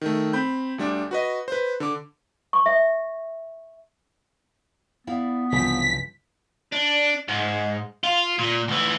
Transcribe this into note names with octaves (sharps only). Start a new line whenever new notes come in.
D#3 A3
C4 B5 G6
D2 G3 D4
F#4 B4 D#5
B4 C5
D3 D6
C#6
E5
B3 E4 D5 F5
C2 G2 C#3 E3 F3 B6
D4
G#2
F4
A#2
D2 E3